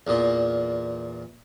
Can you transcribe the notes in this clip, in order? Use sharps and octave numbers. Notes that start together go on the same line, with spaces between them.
E2 A#2